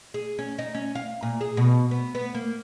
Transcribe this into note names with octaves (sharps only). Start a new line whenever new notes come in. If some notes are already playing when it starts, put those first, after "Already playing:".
G#4
C#4
D#4
C#4
F5
A#2
G#4
B2
B3
B3
A#3